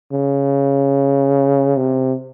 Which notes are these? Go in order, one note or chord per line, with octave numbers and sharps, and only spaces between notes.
C#3
C3